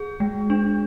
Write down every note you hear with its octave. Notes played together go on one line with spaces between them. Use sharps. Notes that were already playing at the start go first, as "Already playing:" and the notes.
Already playing: G#4
G#3
D4